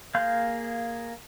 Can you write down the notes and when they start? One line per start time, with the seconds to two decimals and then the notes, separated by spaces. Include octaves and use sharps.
0.15 A#3 G#4 F5 C6 G6